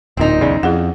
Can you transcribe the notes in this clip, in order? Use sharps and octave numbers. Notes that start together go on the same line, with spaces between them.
D1 A#2 C4 D#4
B1 E2 C#3 C#4 D5
F2 E4 G#4 F#5